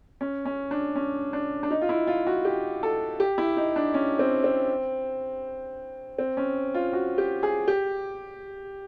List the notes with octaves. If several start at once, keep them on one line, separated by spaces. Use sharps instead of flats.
C#4
C#4
D4
C#4
D4
D4
D#4
F4
E4
F4
F#4
G4
A4
G4
E4
D#4
D4
C#4
C4
C4
C4
C#4
F4
F#4
G4
G#4
G4